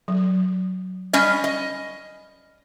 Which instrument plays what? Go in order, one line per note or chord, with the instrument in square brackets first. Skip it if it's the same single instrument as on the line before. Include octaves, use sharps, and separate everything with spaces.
[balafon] F#3
[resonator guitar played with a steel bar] G3 C#4 D#5
D#5